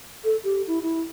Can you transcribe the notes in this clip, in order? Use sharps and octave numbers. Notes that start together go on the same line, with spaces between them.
A4
G4
E4
E4